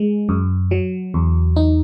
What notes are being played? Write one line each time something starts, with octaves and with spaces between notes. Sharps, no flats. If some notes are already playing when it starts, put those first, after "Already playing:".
Already playing: G#3
F#2
F#3
E2
D#4